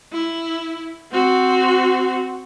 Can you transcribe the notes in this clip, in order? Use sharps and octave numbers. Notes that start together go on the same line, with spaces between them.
E4
C4 F#4